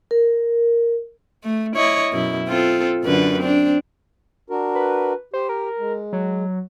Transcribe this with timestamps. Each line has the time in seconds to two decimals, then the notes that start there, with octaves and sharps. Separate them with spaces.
0.11 A#4
1.43 A3
1.76 E4 C#5 D#5
2.12 F#2 B2 E4
2.48 C4 F4 A4
3.04 F#2 D3 B4
3.39 C4 D4
4.50 D4 F#4 A#4
4.75 B4
5.34 G4 C5
5.49 A#4
5.79 G#3
6.13 F#3